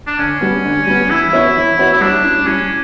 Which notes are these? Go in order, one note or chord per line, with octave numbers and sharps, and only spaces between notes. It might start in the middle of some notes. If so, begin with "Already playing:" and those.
D4
D3 C#4
G3 B3
D3
G3 B3
E3 E4
B3 F#4 C#5 E5
E3
B3 F#4 C#5 E5
E4
G3 D4
C#4 E4
G3 C#4